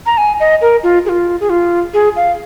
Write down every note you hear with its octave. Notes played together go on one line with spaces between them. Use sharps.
A#5
G#5
D#5
A#4
F4
G#4
F4
G#4
F4
G#4
F5